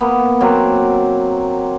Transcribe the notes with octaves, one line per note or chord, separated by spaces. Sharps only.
A#3 B3
F#3 A#3 C4